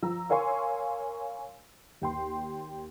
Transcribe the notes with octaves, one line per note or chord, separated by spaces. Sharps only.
F3 A#5 E6
A#4 C#5 F5 G#5 C6 C#6
D#2 G5 C6